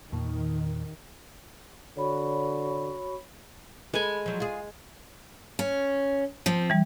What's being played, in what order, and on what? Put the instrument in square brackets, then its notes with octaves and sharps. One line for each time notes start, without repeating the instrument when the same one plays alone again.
[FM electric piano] E2 A#2 [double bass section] D#3
[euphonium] D3 [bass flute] F#4 [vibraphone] C#5 B5
[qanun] G#3 G#5 [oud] A4 B4
[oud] F3 F#3
F4 G#4
[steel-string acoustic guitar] C#4
F3 C4
[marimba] E3 G3